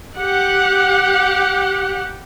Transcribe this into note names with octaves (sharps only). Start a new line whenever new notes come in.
G4 F#5